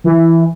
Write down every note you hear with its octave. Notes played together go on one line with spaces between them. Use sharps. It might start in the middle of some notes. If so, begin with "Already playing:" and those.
E3